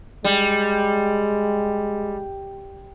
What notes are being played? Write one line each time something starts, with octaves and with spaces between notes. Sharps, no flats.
G3 G#3